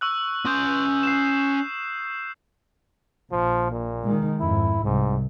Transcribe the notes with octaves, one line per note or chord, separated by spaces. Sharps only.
C#6 E6 F#6
C#4 C6 C#6 D#6 G6
C7 E7
A#1 F3
A#2
D#3 G#3
F2 G#2 E4
C2 G#2